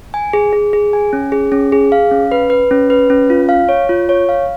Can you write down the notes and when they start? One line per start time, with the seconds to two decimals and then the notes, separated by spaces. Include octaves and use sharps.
0.14 G#5
0.33 G#4
0.53 G#4
0.73 G#4
0.93 G#5
1.13 C#4
1.32 G#4
1.52 C#4
1.72 G#4
1.92 F5
2.11 C#4
2.32 B4
2.50 B4
2.71 C#4
2.90 B4
3.10 C#4
3.30 F4
3.49 F5
3.69 C#5
3.89 F4
4.09 C#5
4.29 F5